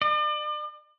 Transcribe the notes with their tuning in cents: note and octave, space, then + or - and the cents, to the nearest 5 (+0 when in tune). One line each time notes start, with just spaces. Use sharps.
D5 +40